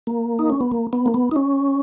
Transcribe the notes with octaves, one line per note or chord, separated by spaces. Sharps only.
A#3
D#4
C#4
B3
A#3
B3
A#3
B3
D#4
C#4